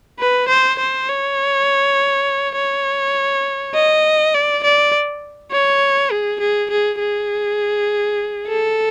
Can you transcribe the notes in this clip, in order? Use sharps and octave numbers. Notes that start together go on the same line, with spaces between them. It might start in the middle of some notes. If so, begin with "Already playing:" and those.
B4
C5
C5
C#5
C#5
D#5
D5
D5
C#5
G#4
G#4
G#4
G#4
A4